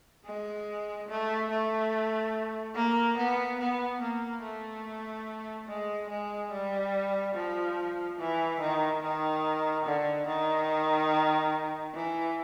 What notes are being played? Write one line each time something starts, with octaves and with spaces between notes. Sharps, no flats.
G#3
A3
A3
A#3
B3
B3
A#3
A3
G#3
G#3
G3
F3
E3
D#3
D#3
D3
D#3
E3